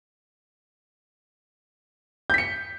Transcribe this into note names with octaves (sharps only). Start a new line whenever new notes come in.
G6 B6 C#7